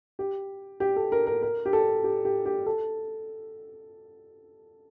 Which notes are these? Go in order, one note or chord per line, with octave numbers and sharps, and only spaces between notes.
G4
G4
A4
A#4
A#4
A#4
G4
A4
G4
G4
G4
A4